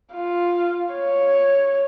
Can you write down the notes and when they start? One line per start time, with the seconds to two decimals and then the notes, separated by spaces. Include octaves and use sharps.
0.13 F4
0.94 C#5